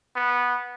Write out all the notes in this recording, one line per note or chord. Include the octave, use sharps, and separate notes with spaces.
B3